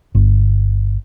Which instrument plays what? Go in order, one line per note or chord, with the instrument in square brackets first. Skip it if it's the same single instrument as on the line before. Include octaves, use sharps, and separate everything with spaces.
[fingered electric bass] G1